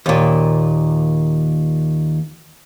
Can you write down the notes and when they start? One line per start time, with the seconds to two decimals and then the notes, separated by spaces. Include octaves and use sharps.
0.06 D#2 A#2